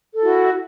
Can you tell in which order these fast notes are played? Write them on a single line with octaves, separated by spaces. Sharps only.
A4 E4 F#4